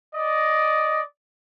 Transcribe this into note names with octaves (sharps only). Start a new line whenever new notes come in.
D5 D#5